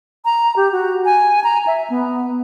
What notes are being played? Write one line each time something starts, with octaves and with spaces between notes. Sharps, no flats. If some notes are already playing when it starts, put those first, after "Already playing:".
A#5
G4
F#4
G#5
A#5
E5
B3